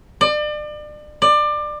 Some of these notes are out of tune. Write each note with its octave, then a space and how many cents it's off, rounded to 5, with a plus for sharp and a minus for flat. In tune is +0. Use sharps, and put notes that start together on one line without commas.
D5 +35
D5 +25